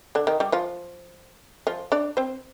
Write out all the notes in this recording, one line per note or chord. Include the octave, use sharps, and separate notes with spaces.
D3 D4
D#3 D#4
G3 G4
F3 F4
F3 F4
D4 D5
C4 C5